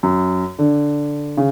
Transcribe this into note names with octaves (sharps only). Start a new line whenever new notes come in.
F#2
D3
C#3